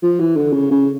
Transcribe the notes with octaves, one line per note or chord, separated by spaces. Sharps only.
F3
E3
D3
C#3
C#3